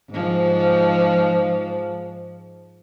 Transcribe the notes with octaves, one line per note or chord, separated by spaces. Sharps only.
G#2 F3